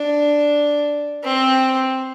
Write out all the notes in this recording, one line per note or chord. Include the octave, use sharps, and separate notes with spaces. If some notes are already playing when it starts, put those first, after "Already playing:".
Already playing: D4
C4